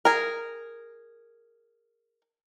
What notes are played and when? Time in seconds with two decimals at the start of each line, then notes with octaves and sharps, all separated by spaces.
0.05 G#4 A#4